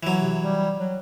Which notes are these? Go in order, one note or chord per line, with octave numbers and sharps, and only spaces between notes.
E3 F#3
C3
G3
F#3